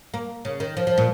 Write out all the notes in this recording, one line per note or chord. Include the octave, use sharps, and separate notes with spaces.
A#3
C#3
D#3
F3
F3
A#2